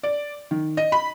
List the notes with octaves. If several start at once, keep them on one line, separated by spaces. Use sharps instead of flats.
D5
D#3
D#5
B5